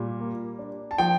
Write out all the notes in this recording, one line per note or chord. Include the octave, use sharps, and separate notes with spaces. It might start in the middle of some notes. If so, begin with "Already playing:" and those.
Already playing: A#2 G3
A#3
D4
A5
F3 G5